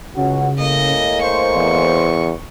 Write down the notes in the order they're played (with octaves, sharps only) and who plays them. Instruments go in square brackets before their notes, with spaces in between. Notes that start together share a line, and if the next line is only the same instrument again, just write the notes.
[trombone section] C#2 F#4 [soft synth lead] C#3
[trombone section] A2 G#3 A#3 [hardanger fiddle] D#5
[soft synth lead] C5 [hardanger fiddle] C#6
[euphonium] E2